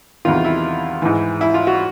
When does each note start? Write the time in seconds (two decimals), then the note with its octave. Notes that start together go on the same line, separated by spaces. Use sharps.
0.25 E2 C3 D#3 F4
0.45 E4
1.02 G#2 E3
1.41 E4
1.54 F4
1.67 F#4